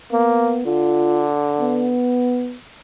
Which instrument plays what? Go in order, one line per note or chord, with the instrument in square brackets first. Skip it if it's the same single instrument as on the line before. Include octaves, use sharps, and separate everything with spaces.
[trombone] A#3 [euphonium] B3
[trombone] D3 [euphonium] F4
[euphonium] B3